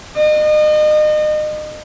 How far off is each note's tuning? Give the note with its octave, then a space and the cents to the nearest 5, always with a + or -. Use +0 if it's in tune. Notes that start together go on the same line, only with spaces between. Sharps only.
D#5 -35